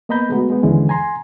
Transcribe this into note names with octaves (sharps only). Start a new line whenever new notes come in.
A#3 B3 D#5 A#5 B5 G6
G#3 A3 B3 F#4
G#3 B3
D#2 D3 E3 G#3 C#4
G#5 A#5 C6